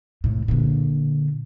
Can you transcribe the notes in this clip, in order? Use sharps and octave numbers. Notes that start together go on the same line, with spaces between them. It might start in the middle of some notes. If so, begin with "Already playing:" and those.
A2 C3
A#2 D3